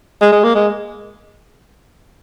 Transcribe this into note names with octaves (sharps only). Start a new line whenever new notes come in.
G#3
G#3
A#3
G#3